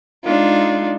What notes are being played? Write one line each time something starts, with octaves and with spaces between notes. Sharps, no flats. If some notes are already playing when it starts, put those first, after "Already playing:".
G#3 D4 D#4 F4